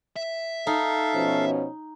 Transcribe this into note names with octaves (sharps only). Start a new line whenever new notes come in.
E5
D#4 A4 F5
B2 F3 C#4